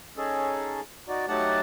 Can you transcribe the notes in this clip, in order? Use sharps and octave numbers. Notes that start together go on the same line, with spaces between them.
C#4 D#4 G#4 A4
D#4 F#4 D5
F#3 A3 D#4 G4 F#5 A5